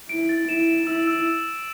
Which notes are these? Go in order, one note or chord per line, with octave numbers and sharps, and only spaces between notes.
E4 D7
A6
E4 E7
E7
E4 E6
E6